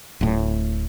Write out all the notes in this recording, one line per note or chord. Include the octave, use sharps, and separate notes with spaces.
D1 A2